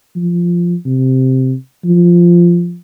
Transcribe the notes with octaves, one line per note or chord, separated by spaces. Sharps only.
F3
C3
F3